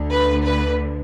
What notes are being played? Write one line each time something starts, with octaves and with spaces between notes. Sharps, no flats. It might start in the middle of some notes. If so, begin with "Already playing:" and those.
Already playing: D2 D3
B4
B4